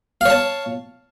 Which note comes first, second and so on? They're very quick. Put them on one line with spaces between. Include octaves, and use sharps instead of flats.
F5 C#5 A5